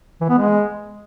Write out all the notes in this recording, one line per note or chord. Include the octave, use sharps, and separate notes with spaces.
E3
B3
G#3